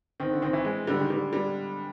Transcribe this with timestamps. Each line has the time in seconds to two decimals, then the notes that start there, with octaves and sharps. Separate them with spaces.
0.20 D#3 C4
0.32 D3
0.42 D#3 C4
0.53 E3
0.65 G#3
0.87 D3 G3
1.00 D#3
1.10 D3 G3
1.33 G3